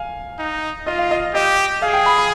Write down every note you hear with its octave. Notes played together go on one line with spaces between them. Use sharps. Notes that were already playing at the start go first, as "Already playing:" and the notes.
Already playing: F5 G#5
D#4
F4 D#5
F5
D#5
G4 D#5
G#4 F5
G5
B5
B5